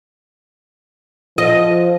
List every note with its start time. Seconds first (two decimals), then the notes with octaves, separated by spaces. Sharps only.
1.38 F3 D#5